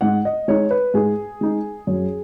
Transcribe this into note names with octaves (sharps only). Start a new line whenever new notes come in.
G#2 F#5
D#5
G#3 D#4 C#5
B4
G#2 G#4
G#3 D#4
F#2